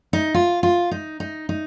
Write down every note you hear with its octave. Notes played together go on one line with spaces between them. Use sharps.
D#4
F4
F4
D#4
D#4
D#4